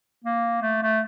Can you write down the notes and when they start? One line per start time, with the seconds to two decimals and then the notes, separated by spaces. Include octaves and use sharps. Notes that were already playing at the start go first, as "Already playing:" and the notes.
0.24 A#3
0.62 A3
0.82 A3